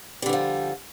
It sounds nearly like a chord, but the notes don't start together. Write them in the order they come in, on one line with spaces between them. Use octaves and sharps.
G3 D3 E3 F3